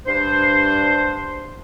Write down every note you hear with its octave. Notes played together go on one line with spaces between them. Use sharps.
G2 D4 C5